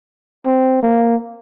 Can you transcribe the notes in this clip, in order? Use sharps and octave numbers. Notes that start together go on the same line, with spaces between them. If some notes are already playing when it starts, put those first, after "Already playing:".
C4
A#3